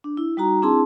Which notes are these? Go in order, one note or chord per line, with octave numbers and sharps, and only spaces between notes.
D4
E4
G3 D#4 F#4 A#5
C4 D4 E4 G#4 A5 C6